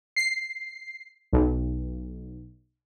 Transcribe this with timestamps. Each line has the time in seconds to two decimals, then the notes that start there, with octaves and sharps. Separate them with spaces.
0.16 C7
1.33 B1